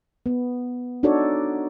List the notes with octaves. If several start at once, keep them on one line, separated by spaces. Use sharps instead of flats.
B3
D4 D#4 F#4 A4 C#5 D5